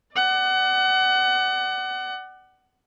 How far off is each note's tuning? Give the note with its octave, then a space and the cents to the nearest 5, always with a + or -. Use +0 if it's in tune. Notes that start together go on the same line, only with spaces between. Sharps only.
D5 +25 F#5 +25